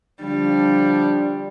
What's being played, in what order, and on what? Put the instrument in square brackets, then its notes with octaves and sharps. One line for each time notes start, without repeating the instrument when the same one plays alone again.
[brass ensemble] D3 F3 D4 [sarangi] G3